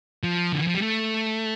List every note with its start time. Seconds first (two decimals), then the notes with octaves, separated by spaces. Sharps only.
0.23 F3
0.52 D3
0.59 E3
0.67 F3
0.74 G3
0.82 A3